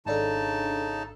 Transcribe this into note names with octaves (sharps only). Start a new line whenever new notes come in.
G#1 C#3 D4 D#4 A4 A5